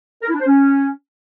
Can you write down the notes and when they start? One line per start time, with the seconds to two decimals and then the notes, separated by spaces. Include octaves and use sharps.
0.22 A#4
0.28 E4
0.34 D4
0.40 C5
0.46 C#4